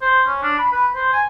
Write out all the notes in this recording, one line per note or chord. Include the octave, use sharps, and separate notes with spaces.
C5
C#4
D4
B5
B4
C5
G#5